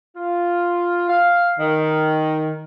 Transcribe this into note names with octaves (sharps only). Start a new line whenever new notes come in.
F4
F5
D#3